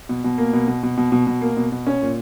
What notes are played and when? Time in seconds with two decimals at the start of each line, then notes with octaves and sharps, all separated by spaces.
0.09 B2
0.24 B2
0.38 A#3
0.53 B2
0.68 B2
0.83 B2
0.97 B2
1.12 B2
1.27 B2
1.41 A#3
1.57 B2
1.72 B2
1.87 C#4
2.01 A#2